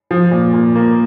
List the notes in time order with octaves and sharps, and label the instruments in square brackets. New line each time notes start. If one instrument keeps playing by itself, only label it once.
[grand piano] F3
A#2
A#2
A#3